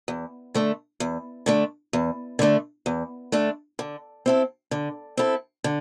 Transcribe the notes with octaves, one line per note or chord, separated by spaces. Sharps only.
E2
D3 A3 D4
E2
D3 A3 D4
E2
D3 A3 D4
E2
D3 A3 D4
D3
C4 E4 A4
D3
C4 E4 A4
D3